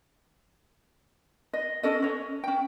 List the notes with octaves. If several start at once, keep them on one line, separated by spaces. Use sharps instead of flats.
D#5
C#4 A4 D#5
C#4 C#5
C#4 G5